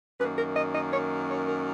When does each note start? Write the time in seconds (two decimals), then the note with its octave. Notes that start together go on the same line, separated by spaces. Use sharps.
0.20 F#2 D#3 A#3 B4
0.38 A#4
0.57 D#5
0.75 D#5
0.94 C#5
1.31 C#5
1.49 A#4